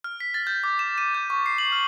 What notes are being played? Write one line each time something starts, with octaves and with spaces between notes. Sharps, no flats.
F6
B6
A6
G6
D6
E7
D#7
G6
C#6
C7
F#7
F6